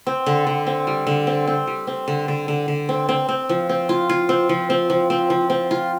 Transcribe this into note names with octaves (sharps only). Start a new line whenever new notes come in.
C4
D3
D3
C4
G3
D3
C4
C4
G3
C4
D3
D3
D3
D3
C4
C4
C4
F3
C4
F4
F4
C4
F3
C4
F3
C4
F3
C4
F4